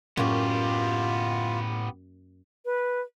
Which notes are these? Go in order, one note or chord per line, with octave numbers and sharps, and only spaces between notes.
F#2 A2 A#3 B3 F4 G4
B4